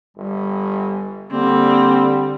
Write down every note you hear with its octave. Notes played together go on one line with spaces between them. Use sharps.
G1 G3
D3 G3 A#3 C4